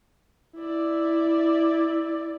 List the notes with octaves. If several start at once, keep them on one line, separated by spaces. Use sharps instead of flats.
E4 D5